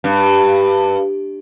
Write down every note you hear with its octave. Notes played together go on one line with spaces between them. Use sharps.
G2